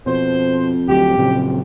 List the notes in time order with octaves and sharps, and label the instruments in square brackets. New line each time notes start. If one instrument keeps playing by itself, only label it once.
[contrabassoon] F2 [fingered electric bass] B2 [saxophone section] C5
[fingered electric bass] D2 F#3 [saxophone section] G4
[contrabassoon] F2 [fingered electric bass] A#2 C#3 F#3